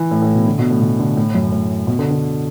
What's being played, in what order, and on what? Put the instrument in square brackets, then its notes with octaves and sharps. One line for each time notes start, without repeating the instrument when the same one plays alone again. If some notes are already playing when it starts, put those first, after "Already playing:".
Already playing: [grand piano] E3
A2
A2
B2
D3
B2
A2
B2
D3
A2
F#2
A2
B2
D3
D3